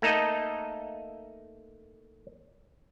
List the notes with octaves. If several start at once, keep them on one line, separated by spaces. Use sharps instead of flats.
A3 A#3 D#4 A4 D#5